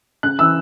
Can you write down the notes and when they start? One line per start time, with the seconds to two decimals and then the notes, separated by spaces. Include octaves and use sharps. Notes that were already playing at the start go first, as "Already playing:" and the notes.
0.23 C#3 F#6
0.39 E3 E6